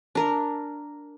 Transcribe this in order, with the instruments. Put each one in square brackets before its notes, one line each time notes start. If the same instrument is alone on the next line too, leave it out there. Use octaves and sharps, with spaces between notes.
[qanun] D4 A#4